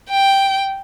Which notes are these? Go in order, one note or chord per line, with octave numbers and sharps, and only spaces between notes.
G5